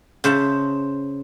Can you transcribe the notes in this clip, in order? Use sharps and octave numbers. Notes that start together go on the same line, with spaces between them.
C#3 C5 E5 A5